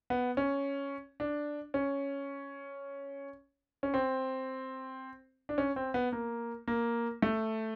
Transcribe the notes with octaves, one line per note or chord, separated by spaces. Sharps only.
B3
C#4
D4
C#4
C#4
C4
D4
C#4
C4
B3
A#3
A#3
A3